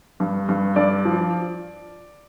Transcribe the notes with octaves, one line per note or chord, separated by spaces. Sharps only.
G2
G2
G2 D5
F3